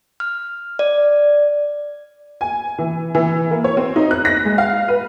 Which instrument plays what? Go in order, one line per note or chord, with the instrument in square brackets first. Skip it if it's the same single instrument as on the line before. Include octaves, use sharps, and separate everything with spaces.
[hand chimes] F6
D5
[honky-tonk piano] G#5
E3
E3
A#3
C#5
C4
D#4
F#6
A#6
G#3
F5
B4